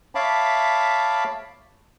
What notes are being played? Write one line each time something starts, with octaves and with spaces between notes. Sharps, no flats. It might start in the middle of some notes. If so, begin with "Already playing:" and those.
C#5 E5 F5 A5 B5 D6